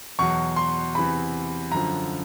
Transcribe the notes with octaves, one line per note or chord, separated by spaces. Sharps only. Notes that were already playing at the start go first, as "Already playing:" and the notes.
E2 B2 F#3 C#6
C6
E2 C3 E3 B5
F#2 D3 F3 A#5